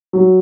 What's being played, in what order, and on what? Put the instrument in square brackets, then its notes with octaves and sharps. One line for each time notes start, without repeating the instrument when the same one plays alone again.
[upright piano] F#3